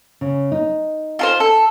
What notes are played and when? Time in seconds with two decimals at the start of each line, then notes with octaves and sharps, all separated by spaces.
0.21 C#3
0.52 D#4
1.19 F4 A4 C5
1.40 A4